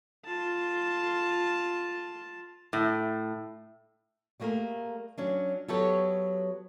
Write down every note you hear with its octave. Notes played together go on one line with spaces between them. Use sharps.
F4 A5
A2
G3 A3 A#3 G4 G#4 A#4
F#3 C#4 D4
F#3 B3 G4 A4 B4 C#5